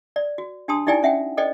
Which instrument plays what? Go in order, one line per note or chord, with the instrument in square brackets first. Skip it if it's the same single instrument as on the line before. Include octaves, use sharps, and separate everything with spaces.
[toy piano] D5
F#4
D4 G4 A5 C6 D#6
D#4 E4 G4 D5 G5 G#5
C#4 E5 F#5 G5
A4 C5 D5 D#5 G5